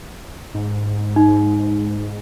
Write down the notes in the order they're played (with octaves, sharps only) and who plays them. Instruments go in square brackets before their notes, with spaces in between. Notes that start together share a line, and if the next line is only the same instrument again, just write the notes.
[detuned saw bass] G#2
[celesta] D#4